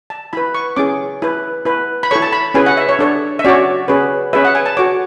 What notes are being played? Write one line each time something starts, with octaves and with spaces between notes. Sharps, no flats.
A5
E4 B4 B5
C#6
C#4 E4 G#4 D6
E4 B4
E4 B4
B5
E4 A4 C#5 C#6
A5
B5
C#4 E4 G#4 B4 G#5
F#5
E5
C#5
D4 A4 C#5
E5
C#4 F#4 C#5 D5
C#4 G#4 B4
C#4 G#4 B4 E5
F#5
G#5
A5
F#4 A4 C#5 D6